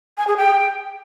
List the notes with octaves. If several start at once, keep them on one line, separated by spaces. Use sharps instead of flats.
G#5
G#4
G5